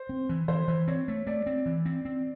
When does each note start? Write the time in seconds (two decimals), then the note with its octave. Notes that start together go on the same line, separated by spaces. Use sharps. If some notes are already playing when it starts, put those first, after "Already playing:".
Already playing: C5
0.09 C4
0.29 E3
0.48 E3 C5
0.68 E3
0.88 C4 C#5
1.08 A3
1.27 A3 D5
1.46 C4
1.66 E3
1.85 C4
2.05 C4